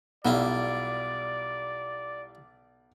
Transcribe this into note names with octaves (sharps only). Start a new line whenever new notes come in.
B1 G3 E4 F4 D5